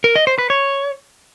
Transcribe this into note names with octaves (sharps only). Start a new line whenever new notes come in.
A#4
D#5
C5
B4
C#5